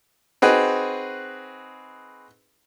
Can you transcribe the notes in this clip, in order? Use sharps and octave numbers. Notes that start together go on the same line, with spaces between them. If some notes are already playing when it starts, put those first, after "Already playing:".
C4 D#4 F#4 G#4 B4